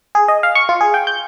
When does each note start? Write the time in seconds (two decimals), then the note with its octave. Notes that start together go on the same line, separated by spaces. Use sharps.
0.15 G#4
0.28 D#5
0.43 F5
0.55 C#6
0.69 F4
0.81 G#4
0.94 G5
1.07 G6